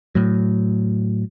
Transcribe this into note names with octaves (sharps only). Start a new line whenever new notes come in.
A2 F#3